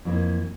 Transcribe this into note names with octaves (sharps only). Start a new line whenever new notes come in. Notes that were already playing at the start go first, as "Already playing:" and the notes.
F2 E3 A#3